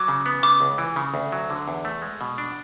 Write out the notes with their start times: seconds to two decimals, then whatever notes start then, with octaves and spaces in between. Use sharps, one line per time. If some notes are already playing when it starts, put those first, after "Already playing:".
Already playing: F#3 D6
0.08 C#3
0.26 B3
0.43 C#3 D6
0.61 C#2
0.78 E3
0.96 C#3
1.14 D2
1.32 F#3
1.50 D3
1.68 E2
1.85 A3
2.02 G#3
2.21 B2
2.38 D4